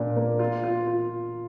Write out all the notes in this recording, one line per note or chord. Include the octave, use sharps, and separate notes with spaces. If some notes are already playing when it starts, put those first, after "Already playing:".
Already playing: A#2 D4
A#3
F4
F4
F4